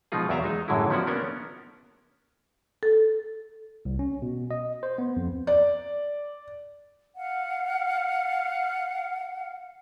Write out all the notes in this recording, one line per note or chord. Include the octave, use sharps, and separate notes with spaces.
B2 F3 G#3 D#4 F4 G#4
E2 F#3 D5 E5 F5 A#5
G#3 D#4
F#2 A2 D3 F#3 G#3 E4
F3 B3 C#4 E4 F#4 D5
A#3 B3 C#4 D4 A#4
A4
C2
C#4
B2
D#5
C5
B3
F2
D5
F5 F#5